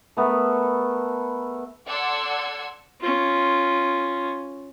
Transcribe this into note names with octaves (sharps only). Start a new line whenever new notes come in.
A3 B3 A4 A#4
A4 D5 F#5 C6 E6 G#6
C#4 F4